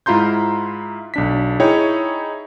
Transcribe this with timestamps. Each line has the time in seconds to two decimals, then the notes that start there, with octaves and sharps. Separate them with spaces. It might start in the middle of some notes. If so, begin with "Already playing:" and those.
0.06 G#2 E4 F4 A#5 C6 G6
1.14 B1 D4 B6
1.60 D#4 E4 G#4 C#5 G5